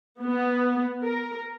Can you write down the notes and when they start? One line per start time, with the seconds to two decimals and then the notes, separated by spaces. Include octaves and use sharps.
0.20 B3
1.04 A#4